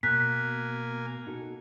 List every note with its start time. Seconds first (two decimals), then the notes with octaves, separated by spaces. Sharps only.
0.03 B2 A#3 G#5 F#6 B6
1.27 D#4 F#4 A4